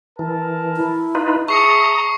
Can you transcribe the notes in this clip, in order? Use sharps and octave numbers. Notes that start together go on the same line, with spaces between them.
E3 A#4 A5
E4
D#4 F4 B4
G#4 E5 A5 A#5 C#6 D#6 C7 C#7